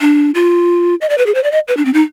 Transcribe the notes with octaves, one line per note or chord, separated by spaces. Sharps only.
D4
F4
D#5
D5
B4
G#4
C5
D5
D#5
B4
D4
C4
D#4